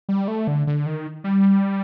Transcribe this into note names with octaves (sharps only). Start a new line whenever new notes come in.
G3
A3
D3
D3
D#3
G3